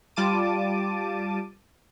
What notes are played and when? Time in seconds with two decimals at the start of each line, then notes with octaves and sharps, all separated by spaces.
0.16 G3 F4 A5 D6 D#7